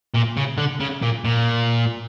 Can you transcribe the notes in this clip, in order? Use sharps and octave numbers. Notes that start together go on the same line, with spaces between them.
A#2
C#3
D3
C#3
A#2
A#2